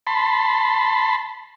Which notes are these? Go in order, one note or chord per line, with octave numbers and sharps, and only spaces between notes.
A5 B5 C6